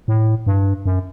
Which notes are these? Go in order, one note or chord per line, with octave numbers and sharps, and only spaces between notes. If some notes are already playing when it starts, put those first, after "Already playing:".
A2
G2
F#2